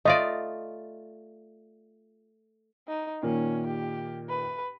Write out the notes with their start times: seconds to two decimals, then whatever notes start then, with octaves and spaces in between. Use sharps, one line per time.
0.05 A3 F4 D5 D#5
2.88 D#4
3.23 A#2 D#3 A#3 C#4
3.67 G4
4.29 B4